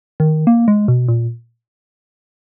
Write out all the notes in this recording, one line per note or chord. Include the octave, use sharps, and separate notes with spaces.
D#3
A#3
G#3
B2
A#2